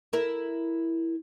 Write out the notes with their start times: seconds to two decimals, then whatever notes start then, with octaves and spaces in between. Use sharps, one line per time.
0.13 E4 A#4